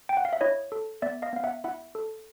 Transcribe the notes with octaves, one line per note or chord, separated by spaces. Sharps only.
G5
F#5
F5
E5
E4 C#5 D#5
A4
B3 D5 E5
D#5 F5
B3 F5
E5 F#5
E4 E5 F#5
A4